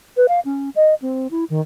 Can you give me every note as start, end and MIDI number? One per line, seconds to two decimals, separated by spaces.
0.17 0.26 71
0.28 0.40 77
0.45 0.70 61
0.76 0.94 75
1.02 1.27 60
1.31 1.45 64
1.50 1.61 51